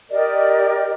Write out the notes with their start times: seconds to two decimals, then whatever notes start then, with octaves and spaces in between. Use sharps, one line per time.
0.10 G4 A#4 D5 D#5